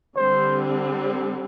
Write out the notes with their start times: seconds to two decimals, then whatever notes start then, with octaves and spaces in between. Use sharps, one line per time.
0.16 D3 G3 C4 C5